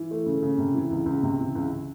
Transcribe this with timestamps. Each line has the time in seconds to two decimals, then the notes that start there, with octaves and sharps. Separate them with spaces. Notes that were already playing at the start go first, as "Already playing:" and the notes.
Already playing: E3
0.11 A3
0.26 C#3
0.42 C#3
0.58 C3
0.74 E3
0.91 C#2
1.06 C#2
1.23 C3
1.39 E3
1.55 C#2